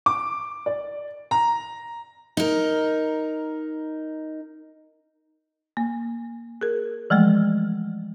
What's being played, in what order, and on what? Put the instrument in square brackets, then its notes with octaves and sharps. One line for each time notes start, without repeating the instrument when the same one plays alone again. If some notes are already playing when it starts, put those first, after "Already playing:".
[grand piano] D6
D5
A#5
[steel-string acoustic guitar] D#4 A#4
[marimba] A#3
G#4 A#4
E3 F3 G#3 A3